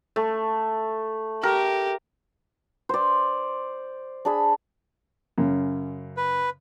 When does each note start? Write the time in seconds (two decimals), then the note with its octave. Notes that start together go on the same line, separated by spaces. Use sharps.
0.16 A3
1.43 G4 A#4
2.89 C5 D5
4.25 D4 G#4 B5
5.38 F#2 C#3
6.17 B4